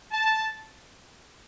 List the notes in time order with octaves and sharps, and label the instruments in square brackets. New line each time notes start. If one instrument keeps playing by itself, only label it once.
[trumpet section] A5